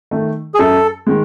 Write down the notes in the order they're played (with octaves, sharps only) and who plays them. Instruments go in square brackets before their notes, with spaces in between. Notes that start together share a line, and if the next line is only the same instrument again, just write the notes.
[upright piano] D#3 A3
[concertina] G#4
[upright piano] F#2 [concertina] A4
[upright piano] D#3 G#3